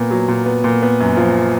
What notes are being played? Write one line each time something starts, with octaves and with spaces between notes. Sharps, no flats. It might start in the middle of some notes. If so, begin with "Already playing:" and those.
Already playing: A#2 B3
F#3
A#2
B3
A#2
B3
F#2
F3